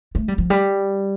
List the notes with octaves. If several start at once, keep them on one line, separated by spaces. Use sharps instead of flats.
A3
G3
F3
G3